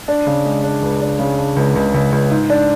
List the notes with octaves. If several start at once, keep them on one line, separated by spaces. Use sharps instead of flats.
D4
C#3
G#3
D4
C#2
D4
C#3
D4
C#2
C#2
C#2
C#2
G#2
D4